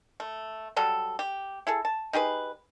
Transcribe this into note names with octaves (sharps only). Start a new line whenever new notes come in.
A3
F#3 G3 A4
G4
E4 G#4 A4
A5
D#4 G4 G#4 B4